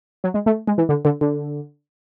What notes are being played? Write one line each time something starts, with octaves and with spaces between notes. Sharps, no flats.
F#3
G#3
A3
G#3
E3
D3
D3
D3